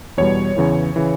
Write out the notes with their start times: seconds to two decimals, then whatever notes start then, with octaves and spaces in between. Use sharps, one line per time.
0.17 E2 B2 G3 C#5
0.56 E2 C#3 E3
0.96 C#3 E3